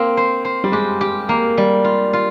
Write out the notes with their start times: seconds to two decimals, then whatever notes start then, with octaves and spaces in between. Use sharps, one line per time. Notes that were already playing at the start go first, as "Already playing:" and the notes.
Already playing: A#3 C4
0.17 C5
0.45 C5
0.64 G3
0.72 G#3 G4
1.01 G4
1.29 A#3
1.58 G3
1.84 F4
2.13 F4